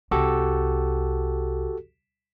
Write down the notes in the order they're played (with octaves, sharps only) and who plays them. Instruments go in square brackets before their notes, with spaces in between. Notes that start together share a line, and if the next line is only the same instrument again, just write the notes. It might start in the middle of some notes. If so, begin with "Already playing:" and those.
[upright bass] C2 [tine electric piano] F#4 G4 A4